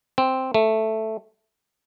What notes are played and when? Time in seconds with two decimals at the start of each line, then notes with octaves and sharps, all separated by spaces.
0.18 C4
0.54 A3